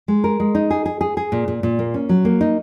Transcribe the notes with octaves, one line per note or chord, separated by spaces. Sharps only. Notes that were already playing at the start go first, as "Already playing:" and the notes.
G#3
A#4
G#3
D#4
G#4
G#4
G#4
G#4
A#2
A#2
A#2
A#3
C#4
F#3
A#3
D#4